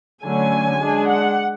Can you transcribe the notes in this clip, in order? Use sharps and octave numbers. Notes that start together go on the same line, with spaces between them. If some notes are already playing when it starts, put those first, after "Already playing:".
D3 F#3 A3 C#4 G#5
G#3 D4
F#5